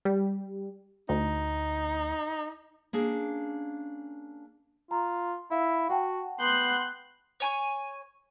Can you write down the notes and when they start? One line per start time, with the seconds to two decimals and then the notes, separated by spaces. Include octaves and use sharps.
0.05 G3
1.09 D2 D#4
2.93 A#3 C#4 D4 G#4
4.91 F4 A#5
5.51 E4 F5
5.90 F#4 F#5 G5 A5
6.40 B3 C6 F#6 G6
7.40 C#5 G#5 C#6